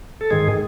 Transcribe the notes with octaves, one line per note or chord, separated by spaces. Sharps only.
A4
G#2 D#3 G#3 G#4